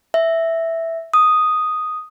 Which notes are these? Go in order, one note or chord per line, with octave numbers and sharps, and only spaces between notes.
E5
D#6